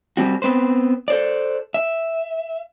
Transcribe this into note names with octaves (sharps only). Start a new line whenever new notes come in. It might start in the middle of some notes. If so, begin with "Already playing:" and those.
G3 C4 F#4
B3 C4 B4 C5
A4 C5 D5
E5